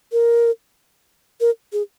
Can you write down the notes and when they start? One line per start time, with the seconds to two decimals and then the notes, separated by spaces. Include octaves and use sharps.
0.12 A#4
1.41 A#4
1.73 G#4